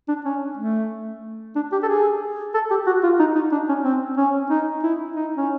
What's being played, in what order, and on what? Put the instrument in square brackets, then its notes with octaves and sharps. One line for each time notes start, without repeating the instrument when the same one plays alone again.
[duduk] D4
C#4
A3
D4
G4
A4
G#4
A4
G4
F#4
F4
D#4
D#4
D4
C#4
C4
C#4
D#4
E4
D#4
C#4